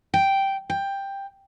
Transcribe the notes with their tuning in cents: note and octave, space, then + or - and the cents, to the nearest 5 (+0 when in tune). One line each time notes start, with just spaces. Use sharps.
G5 -5
G5 +10